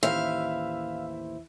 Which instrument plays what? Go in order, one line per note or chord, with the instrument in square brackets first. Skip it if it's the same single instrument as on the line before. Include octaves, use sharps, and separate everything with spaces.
[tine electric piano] A1 D#2 C5 [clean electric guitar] E3 E4 [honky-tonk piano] E5 [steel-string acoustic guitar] F5